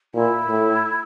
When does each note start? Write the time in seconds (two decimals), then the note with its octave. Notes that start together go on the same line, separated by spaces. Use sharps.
0.14 A#2 E4
0.48 A2